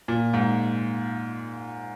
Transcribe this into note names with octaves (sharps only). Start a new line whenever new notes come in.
A#2
G#2